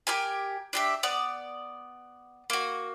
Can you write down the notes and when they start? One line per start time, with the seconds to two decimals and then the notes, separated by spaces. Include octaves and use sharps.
0.07 G4 A#4 G#5
0.73 D4 G4 E5
1.03 B3 D5
2.50 A#3 F#4